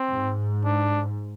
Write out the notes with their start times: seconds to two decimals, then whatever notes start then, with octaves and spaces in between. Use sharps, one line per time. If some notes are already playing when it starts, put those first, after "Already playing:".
Already playing: C4
0.12 G#2
0.64 D4